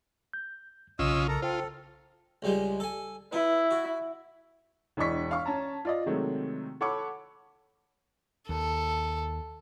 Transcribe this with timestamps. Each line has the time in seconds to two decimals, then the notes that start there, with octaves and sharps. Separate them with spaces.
0.33 G6
0.99 B1 C#3 C#4 F4 D#5 E6
1.28 A4 A#4 A#5
1.42 F4 A4 C5 G5
2.42 C#2 G3 G#3
2.80 A4 G#5
3.33 B3 E4
3.71 F#4
4.97 E1 E3 D4 D#5 C#6 B6
5.31 F5 C#6
5.46 C#4 A5 A#5
5.85 F4 D5 D#5
6.06 C3 D#3 F#3 G#3 A3
6.81 A4 C#5 F#5 B5 C#6 D6
8.49 D#2 A4